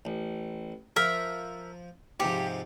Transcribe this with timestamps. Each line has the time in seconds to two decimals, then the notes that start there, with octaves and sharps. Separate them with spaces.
0.05 A1
0.96 F3 A#4 E5
2.20 G#2 C3 F3 G4